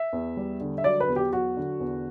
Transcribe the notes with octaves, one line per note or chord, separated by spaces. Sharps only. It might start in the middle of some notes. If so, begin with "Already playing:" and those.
Already playing: E5
E2
G3
D3
E5
F#3 D5
B4
E2
G4
F#3 F#4
D3
E2